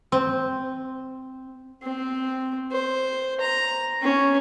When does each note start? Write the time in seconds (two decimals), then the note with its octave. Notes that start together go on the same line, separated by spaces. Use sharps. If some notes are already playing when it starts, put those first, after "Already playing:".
0.12 C4
1.83 C4
2.72 C5
3.41 A#5
4.02 C#4